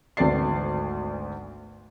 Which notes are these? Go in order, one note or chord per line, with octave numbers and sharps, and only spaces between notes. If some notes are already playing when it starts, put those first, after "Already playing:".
G#1 D2 B3 D5 A6 C7